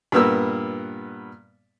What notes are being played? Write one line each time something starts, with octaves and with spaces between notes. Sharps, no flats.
G2 A#2 B3 A#4 E6